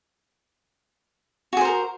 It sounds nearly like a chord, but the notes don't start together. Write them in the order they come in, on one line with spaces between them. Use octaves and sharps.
F#4 G#4 C5 A#4